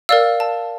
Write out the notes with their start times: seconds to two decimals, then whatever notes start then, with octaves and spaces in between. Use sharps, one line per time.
0.09 A#4 D5 F5 E6
0.40 A5